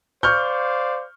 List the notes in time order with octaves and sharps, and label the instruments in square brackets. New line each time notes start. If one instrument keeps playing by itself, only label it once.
[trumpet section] C5 D5 F5 [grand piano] C#6 F6 G6